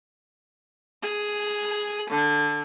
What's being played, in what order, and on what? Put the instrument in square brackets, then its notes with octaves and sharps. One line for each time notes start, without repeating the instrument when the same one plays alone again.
[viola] G#4
D3